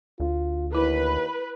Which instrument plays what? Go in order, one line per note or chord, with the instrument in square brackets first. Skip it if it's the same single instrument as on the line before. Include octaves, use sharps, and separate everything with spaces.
[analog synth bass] D2 [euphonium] F4
[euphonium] D#2 [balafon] E4 [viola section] B4